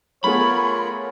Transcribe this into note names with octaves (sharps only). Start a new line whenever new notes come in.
A3 B3 F4 G#4 A#4 C#5 B5